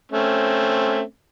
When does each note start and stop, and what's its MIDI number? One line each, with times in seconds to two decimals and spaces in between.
0.12 1.01 57
0.12 1.01 60
0.12 1.01 61